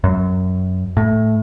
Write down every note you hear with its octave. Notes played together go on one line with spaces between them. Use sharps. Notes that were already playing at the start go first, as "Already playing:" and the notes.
F#2
A2